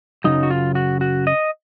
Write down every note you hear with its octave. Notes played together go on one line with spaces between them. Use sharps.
F#2 C#3 F#3 D#4
F#4
F4
F#4
F#4
D#5